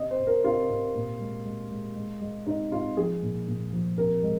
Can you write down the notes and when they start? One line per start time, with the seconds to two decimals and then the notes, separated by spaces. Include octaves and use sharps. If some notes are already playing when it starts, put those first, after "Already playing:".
Already playing: C3 D#5
0.11 C5
0.19 C3
0.27 A#4
0.44 C3 F4
0.70 C3
0.95 A#2
1.20 G#3
1.45 G#3
1.70 G#3
1.96 G#3
2.21 G#3
2.46 C3 D#4
2.72 C3 F4
2.97 F3 G#4
3.22 A#2
3.48 A#2
3.73 F3
3.97 C3 A#4
4.23 G#3